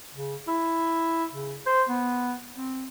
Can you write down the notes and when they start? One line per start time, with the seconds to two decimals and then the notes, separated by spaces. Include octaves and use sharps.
0.14 C#3
0.48 E4
1.32 C#3
1.66 C5
1.89 B3
2.57 C4